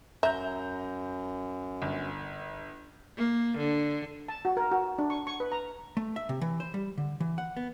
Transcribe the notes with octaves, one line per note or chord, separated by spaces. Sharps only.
F#2 E5 A#5 G6
G1
A#3
D3
A5
F#4
A#4
F#4
D4
C#6
C#6
B4
A#5
A3
E5
C3
E3
C5
G3
D3
E3
F#5
B3